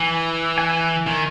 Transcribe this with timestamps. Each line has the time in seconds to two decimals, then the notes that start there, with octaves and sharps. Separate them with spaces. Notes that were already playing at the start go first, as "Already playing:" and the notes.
Already playing: E3 G#5
0.58 G#5
1.07 D#3